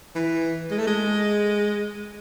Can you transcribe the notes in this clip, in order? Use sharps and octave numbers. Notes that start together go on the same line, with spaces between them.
E3
G#3
A3
G#3